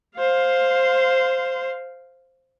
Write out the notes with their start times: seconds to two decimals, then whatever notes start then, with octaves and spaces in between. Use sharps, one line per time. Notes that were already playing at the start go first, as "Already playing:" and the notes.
0.16 C5 F5